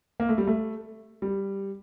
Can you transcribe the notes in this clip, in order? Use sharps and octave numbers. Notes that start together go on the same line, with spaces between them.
A#3
A3
G3
A3
G3